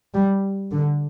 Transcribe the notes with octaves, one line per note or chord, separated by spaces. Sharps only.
G3
D3